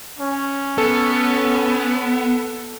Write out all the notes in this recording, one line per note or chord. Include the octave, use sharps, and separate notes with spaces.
C#4
B3 A4